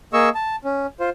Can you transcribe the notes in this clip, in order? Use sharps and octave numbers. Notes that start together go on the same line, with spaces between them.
A#3 G#4 D#5 C#6 E6
A5
C#4
F4 C5